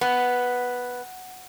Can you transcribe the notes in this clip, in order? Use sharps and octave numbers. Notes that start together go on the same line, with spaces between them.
B3